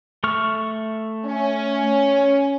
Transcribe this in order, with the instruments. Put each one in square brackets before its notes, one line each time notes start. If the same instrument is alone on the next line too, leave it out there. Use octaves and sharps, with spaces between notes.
[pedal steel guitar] A3 C#6 F6
[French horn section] C#4